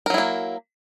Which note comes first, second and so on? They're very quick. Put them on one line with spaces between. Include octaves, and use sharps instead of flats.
A#4 F#3 E4 A#3